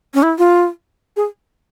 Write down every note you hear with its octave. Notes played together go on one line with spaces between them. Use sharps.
C#4
E4
F4
G#4